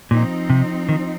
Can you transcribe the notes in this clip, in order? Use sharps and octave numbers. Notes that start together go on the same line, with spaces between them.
A#2 F3 C4 D#4
C3
D#3